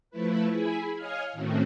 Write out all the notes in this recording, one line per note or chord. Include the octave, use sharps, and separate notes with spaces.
F3 A3 E4 B4
E4 G#4 G#5 B5
C#5 D#5 F5 G#5 F6
A2 D#3 A3 C4 C#4 F#4